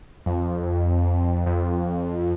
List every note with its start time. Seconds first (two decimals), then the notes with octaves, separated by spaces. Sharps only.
0.26 F2
1.46 F2